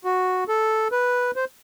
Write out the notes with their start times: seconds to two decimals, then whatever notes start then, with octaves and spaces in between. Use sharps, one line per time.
0.05 F#4
0.48 A4
0.92 B4
1.36 C5